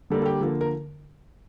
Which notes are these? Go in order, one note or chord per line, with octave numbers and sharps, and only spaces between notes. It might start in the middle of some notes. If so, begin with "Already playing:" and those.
D3 G3 A#3 A4
A4
G4
D3 F3 A#3 A4
A#4